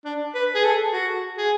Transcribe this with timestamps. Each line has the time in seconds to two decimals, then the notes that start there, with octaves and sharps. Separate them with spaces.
0.05 D4
0.35 B4
0.55 G#4
0.64 A4
0.93 F#4
1.38 G#4